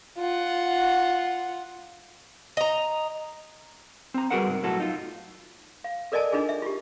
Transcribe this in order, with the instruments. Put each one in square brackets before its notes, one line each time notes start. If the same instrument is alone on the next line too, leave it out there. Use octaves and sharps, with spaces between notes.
[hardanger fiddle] F4 F#5
[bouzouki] D#5 A#5
[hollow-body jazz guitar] C4 A#5
G3 F#4 G#4 A#4 B4 F#5
G#2 C3
B1 A2 F#3 F#4 A4
D#4 F4
[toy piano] F5
A4 A#4 D5 D#5 G#5 A5
D4 D#4 F4 G#4 G#5
E5
F4 G4